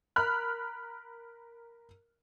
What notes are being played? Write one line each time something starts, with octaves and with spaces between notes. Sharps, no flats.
A#4 B5 F6 F#6